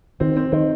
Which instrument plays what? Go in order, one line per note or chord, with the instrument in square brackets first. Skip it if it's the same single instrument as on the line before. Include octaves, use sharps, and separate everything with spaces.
[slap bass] D#3 [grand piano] C4
[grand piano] C4
[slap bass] D#3 [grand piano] C4